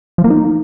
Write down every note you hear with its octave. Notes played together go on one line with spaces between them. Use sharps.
F3
A#3
D#4